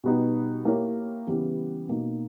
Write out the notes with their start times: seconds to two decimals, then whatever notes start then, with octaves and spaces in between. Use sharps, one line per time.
0.04 B2 G3 B3 D#4 G4
0.65 A#3 E4 G4 A#4 C#5
1.27 C#3 E3 G3 B3 G4
1.88 B2 A#3 D#4